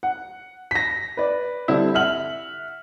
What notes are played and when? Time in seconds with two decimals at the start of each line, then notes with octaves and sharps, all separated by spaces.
0.03 F#5
0.71 A#6 B6
1.17 B4 D5
1.68 D3 G3 C4 D4 E4
1.94 E5 F#5 F6 F#7